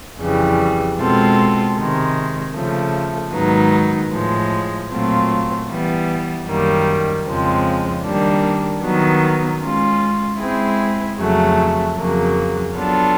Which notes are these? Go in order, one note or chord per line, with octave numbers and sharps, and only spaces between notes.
F2 C#3 E3 G3
B2 G#3 C4 F4 A4
C3 D#3 G#3
C#3 F3 A3
G#2 D#3 F#3 B3 D#4
A2 F3 G#3
A#2 F#3 A3 C4 F4
E3 G3 B3
F#2 D#3 G3 A#3
F2 C#3 F3 G#3 C4
D#3 G3 A#3 D4
D#3 F#3 B3
G#3 C#4 F4
G#3 C4 E4 G#4
F2 C#3 F#3 A3
F2 C#3 F#3 A#3
F#3 B3 D4 F4 A4